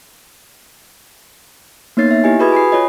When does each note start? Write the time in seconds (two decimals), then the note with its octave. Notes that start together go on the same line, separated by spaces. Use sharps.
1.97 A#3 B3 D#4 C#5 A6 C7
2.11 E5
2.24 E4 G4 D#5 G#5
2.40 F#4 G#4 B4 B5 D#6 G#6
2.52 G#5 B5 D#6 C7
2.72 F4 C#5 D#5